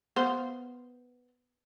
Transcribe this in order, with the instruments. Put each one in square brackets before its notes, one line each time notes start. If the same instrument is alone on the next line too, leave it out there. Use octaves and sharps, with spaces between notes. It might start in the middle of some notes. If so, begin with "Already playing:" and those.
[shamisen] B3 C5 F5